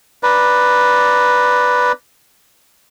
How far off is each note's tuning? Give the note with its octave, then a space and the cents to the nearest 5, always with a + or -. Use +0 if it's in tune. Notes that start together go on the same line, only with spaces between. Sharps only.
B4 +0 D5 +0 A#5 +0